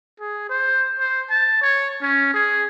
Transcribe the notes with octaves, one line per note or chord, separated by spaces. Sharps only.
G#4
C5
C5
A5
C#5
C#4
G#4